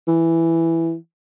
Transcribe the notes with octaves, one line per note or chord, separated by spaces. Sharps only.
E3